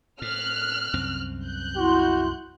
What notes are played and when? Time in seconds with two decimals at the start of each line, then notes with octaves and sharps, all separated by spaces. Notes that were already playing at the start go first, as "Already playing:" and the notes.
0.22 A2 F6 F#6
0.93 C2 F#2 C4
1.44 F#6 G6
1.77 E4 F#4 C6